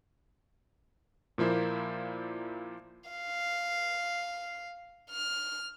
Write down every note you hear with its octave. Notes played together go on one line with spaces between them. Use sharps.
A#2 F3 A#3 E4 C5
F5
F6